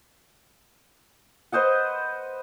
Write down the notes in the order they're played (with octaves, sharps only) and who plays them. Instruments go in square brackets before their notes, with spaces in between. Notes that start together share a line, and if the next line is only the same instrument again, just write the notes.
[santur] B4 C5 D#5 F#5